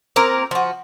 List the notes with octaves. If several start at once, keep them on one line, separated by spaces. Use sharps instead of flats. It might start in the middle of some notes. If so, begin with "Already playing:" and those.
A#3 C4 F4 A#4
F3 F#4